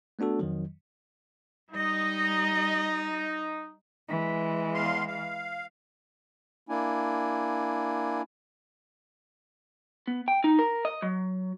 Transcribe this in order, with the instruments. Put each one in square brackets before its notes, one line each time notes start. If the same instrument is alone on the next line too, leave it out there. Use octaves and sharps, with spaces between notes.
[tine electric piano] A3 B3 D4 F#4 A4
F2 D#3 F#3
[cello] G3 D#5 [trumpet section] D#4
[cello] E3 G#3
[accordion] E2 F5 C6
F5
[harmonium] A#3 D4 E4 G#5
[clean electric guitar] B3
G5
D#4
A#4
D#5
F#3